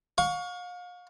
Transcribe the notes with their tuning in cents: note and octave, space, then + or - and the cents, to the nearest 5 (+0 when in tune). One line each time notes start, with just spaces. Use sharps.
F5 +35 C#6 +15